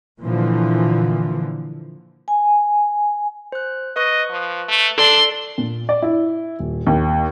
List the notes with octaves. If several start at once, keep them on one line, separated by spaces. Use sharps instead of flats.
A#2 D3 E3 F3
G#5
C5 F#6
B4 D#5 C#6 F#6
F3
A3
D4 A4 D5 A5 C6
A#2
D5
E4
D#1
D#2